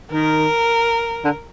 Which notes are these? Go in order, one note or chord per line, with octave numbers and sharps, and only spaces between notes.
D#3 A#4
D3